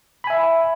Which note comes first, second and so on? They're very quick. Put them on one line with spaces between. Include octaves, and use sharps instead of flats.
B5 G#5 E5